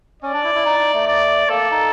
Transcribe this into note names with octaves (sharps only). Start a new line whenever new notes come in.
C#4 D5
D4
E4
E4
D#4
D#4
A3
D5
A#3 A4
D#4